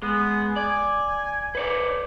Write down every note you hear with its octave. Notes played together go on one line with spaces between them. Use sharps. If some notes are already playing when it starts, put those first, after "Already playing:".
G#3 B3
D5 G#5
B4 C#5 D5